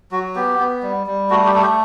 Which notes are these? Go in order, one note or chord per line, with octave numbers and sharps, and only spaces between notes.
F#3 F#4
B3 G4
B3
G3
G3
A3 F#4
G4
A3 A4
G4